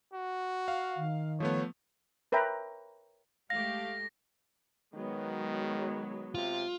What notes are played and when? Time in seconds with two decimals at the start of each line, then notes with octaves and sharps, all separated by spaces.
0.13 F#4
0.68 F5
0.97 D#3
1.40 F3 A3 B3 C#5
2.32 A#4 B4 C#5 E5 G5 A#5
3.50 G#3 A3 G4 F5 A#6
4.94 D#3 F#3 G#3 B3
6.35 C3 F4